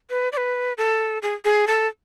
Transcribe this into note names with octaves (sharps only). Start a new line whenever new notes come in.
B4
D5
B4
A4
G#4
G#4
A4